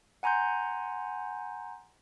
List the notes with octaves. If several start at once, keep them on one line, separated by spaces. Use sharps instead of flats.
F#5 G#5 A#5 C6 G6